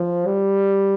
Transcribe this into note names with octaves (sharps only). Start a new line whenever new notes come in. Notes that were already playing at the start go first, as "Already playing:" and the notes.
Already playing: F3
G3